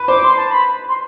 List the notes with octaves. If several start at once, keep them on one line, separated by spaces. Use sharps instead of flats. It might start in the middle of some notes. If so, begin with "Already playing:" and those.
Already playing: B4
C5 D6
C6
A5
B5
C6